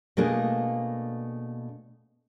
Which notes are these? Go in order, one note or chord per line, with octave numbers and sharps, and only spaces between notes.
B2 A3 A#3 D4 G#4